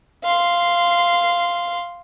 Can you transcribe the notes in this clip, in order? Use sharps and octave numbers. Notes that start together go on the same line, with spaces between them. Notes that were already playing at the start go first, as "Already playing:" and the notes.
F5 C6